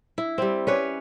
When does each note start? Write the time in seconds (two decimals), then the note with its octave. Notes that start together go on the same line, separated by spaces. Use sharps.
0.18 E4
0.38 G3 C4
0.67 C#4 B4 C#5 D5